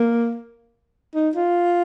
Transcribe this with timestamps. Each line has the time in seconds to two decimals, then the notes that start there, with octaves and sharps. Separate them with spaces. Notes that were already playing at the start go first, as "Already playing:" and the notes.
Already playing: A#3
1.15 D#4
1.36 F4